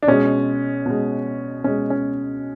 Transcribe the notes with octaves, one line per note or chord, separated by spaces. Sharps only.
D4
B2 G#3 C#4
B2 G#3
B2 G#3 C#4
C#4